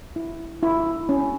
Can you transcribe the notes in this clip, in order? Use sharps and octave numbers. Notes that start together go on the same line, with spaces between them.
E4
E4
C#4